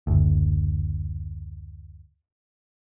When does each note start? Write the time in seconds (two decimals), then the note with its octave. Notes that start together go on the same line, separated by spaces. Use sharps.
0.07 F#1 D2